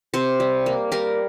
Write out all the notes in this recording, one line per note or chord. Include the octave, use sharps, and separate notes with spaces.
C3 C5
G3
A#3
G3 A#4